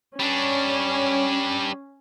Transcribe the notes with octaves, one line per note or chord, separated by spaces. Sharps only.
G3 C#4 D4